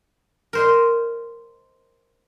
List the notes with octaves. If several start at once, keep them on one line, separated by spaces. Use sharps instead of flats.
A#4 C5 D#5